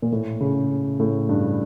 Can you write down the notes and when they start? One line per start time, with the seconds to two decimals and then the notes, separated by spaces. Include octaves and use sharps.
0.02 A#2
0.12 A2
0.40 C#3
1.00 A2
1.29 G2